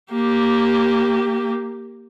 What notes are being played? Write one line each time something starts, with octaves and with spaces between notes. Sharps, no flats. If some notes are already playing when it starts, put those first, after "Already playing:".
A#3 G4